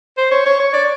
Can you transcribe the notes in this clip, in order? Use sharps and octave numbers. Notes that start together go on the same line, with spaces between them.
C5
C#5
C#5
C#5
D5